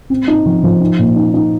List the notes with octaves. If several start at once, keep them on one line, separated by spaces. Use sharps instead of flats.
C4
D#4
F3
F3
D#4
A#2
D#4
D#4